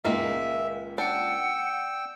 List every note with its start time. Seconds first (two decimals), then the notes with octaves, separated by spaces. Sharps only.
0.05 C#2 A#2 D#3 G#3 A#3 E5
0.98 D4 F#5 G5 E6